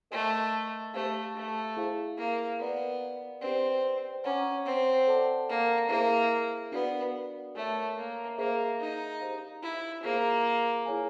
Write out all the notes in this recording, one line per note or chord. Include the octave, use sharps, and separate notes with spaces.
A3 A#4 D#5 G5 C6
A3 G4 C5 F5
A3
E4 G#4 C5 F5
A#3
B3 A#4 D5 F5
C4 G4 B4 D5
C#4 C#5 F#5 A#5 D6
C4
A4 D5 F#5 A5 D6
A#3
A#3 E4 G#4 C5 E5
B3 D4 F#4 A#4 D5 F5
A3 A#4 C#5 E5
A#3
A#3 G#4 C5 E5
D#4
G4 C5 F5
E4
A#3 F4 G#4 C5
E4 G#4 C#5 F5 G#5